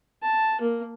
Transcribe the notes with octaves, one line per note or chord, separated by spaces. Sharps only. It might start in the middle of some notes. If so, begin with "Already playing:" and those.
A5
A#3